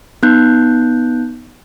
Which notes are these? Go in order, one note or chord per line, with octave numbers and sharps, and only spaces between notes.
B3 D#4 F#6 G6